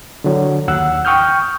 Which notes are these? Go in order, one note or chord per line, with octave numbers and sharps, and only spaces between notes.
D3 F#3
D#2 F#5 E6 F#6
G5 C#6 D#6 F6 G6